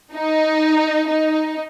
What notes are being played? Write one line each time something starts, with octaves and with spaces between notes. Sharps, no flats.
D#4
D#4